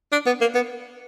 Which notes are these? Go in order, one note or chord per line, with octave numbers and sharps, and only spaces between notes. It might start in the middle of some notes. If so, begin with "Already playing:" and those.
D4
B3
A#3
B3